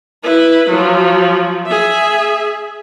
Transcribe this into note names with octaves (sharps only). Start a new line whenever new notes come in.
E4 B4
F3 F#3
G#4 E5